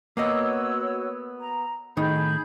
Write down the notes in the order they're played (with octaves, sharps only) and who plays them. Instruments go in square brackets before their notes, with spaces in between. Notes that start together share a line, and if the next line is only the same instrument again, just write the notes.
[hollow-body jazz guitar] A#3 B3 D#5 [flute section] F#4 C#5 E6
[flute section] A#5
[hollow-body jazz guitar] A2 D#3 D#4 [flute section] G#4 B5 G6